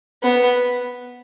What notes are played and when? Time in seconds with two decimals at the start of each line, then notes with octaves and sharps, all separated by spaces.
0.23 B3